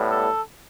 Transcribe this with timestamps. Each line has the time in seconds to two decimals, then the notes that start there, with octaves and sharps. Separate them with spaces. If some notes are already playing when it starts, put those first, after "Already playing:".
Already playing: A2 G3 B3
0.09 A4